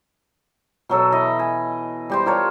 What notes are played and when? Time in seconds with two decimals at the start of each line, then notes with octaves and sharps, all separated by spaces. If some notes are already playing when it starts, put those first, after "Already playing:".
0.89 B2 F#3 A4 D#5
1.12 E3 D#5 B5
1.39 G#5
2.10 G3 G4 C5
2.26 F4 A#4 C#5 A5